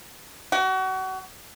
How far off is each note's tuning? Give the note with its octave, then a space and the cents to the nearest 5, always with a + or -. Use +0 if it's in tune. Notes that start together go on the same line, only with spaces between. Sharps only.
F#4 +30